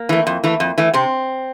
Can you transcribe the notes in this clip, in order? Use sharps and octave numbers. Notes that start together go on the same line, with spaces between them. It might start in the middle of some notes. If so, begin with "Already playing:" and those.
Already playing: A#3
E3 A3
F2
E3 A3
F2
E3 A3
C3 C4